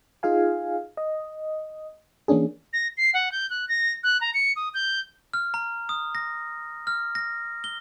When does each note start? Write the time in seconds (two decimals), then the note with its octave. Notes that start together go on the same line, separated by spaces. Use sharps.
0.23 D#4 F4 G#4 F5 G#5
0.97 D#5
2.28 E3 A#3 C#4 D4 G#4
2.73 A#6
2.97 C7
3.14 F#5
3.32 G6
3.50 F#6
3.69 A#6
4.03 F#6
4.21 A#5
4.34 C#7
4.56 D#6
4.74 G6
5.34 F6
5.54 A#5
5.89 D#6
6.15 A#6
6.87 F6
7.15 A#6
7.64 G7